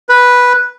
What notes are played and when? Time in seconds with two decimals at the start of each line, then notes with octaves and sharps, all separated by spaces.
0.09 B4